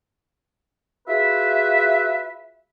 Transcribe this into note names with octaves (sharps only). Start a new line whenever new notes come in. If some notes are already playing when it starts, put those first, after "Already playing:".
F4 F#4 G#4 B4 E5